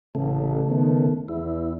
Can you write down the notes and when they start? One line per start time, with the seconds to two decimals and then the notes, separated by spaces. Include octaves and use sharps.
0.15 A1 C#3 A3
0.69 D#3 B3
1.28 E2 E4